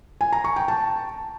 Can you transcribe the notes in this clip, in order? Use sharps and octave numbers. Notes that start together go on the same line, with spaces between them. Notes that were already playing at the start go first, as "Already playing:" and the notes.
G#5
A#5
C#6
G5
A5